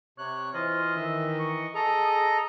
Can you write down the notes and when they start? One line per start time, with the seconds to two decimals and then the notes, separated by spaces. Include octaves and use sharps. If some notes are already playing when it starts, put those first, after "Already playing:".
0.18 C3 C#5 F#6
0.54 E3 F4 C5 D#5
0.96 D#3 E5
1.39 C#6
1.75 G#4 A4 D#5 A#5 D#6
2.04 D#6